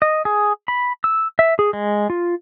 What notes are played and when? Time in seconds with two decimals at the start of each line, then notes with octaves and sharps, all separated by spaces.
0.02 D#5
0.25 G#4
0.68 B5
1.04 E6
1.39 E5
1.59 G#4
1.73 G#3
2.10 F4